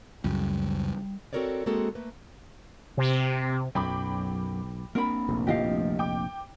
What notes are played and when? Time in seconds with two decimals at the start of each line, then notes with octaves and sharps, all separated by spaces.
0.24 C#2 F#2 G3
1.33 C4 F#4 A4 A#4 C#5 D5
1.66 G#3 A#3 C4 F#4 G#4 A4
1.95 A3 A#3 B4
2.97 C3
3.75 B1 F#2 F#3 G5 B5 D6
4.95 A#3 C4 D4 A#4 B5
5.29 F1 A#1
5.47 A1 F3 G4 D#5 F5
5.99 G5 D6